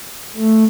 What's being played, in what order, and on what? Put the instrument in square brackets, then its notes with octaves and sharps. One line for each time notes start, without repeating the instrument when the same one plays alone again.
[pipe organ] A3